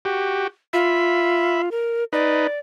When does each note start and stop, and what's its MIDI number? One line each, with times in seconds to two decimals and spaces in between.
0.05 0.47 66
0.05 0.47 67
0.73 1.69 65
0.73 1.62 76
0.73 1.62 83
1.71 2.04 70
2.13 2.47 63
2.13 2.47 71
2.13 2.59 74